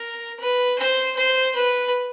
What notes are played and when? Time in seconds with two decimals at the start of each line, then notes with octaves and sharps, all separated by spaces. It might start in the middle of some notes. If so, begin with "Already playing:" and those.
Already playing: A#4
0.40 B4
0.78 C5
1.16 C5
1.55 B4